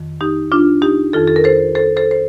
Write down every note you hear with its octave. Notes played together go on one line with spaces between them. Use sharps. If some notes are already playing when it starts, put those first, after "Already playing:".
Already playing: F2 D#3
D#4 G4
D4 F4
D#4 G4
F2 D#3 F4 A4
A4
A#4
A4 C5
A4 C5
A4 C5
C5